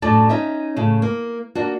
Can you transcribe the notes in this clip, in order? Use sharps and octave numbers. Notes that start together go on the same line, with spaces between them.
F#2 A2 D4 D5 A5
C#4 D#4 E5
A2 C#3
A#3
A#3 D4 F#4